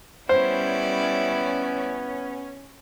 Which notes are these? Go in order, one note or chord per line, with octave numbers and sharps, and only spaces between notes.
G3 B3 C#4 E4 C5 D5